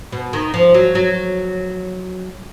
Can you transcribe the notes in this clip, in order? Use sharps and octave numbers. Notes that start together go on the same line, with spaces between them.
B2
D#3
F3
F#3
F#3